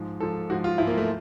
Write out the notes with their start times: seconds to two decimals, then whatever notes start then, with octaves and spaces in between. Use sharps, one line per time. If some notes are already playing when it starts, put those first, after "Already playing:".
Already playing: G#2 F3
0.20 G#2 F3 A4
0.50 G#2 F3 F#4
0.64 F4
0.78 G#2 F3 E4
0.87 A#3
0.98 A3